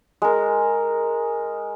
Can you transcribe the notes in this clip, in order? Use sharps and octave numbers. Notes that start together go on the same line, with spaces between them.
G#3 A#4